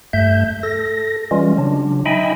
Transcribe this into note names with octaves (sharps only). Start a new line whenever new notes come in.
G2 A3 E5 G6
A4 A#6
E3 G3 G#3 C#4 F4
C#3 F#3 D4
D#4 D#5 E5 G5 G#5 B5